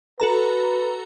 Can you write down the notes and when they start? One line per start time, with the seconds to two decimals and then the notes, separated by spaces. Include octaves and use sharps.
0.20 F#4 A4 B4 A#5